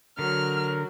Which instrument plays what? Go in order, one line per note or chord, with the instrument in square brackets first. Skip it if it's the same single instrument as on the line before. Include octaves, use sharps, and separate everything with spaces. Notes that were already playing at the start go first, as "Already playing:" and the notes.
[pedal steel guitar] D3 [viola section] F#3 [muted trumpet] A#4 [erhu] F6